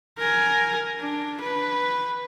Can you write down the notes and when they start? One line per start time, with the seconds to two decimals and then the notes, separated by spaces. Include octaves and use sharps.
0.18 A#4 G#5
1.00 D4
1.41 B4